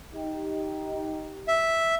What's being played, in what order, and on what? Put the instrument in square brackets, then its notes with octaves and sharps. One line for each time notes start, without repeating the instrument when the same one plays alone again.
[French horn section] D#4 G4
[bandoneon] E5